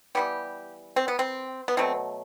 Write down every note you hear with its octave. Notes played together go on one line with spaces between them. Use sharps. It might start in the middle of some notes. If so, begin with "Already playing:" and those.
E3 G3 B3 G4
C4
B3
C4
B3
B2 F#3 A3 C4